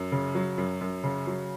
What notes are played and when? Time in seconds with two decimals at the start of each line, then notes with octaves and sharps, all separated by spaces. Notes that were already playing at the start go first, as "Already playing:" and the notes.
Already playing: F#2
0.12 C#3
0.35 F#3
0.58 F#2
0.81 F#2
1.04 C#3
1.27 F#3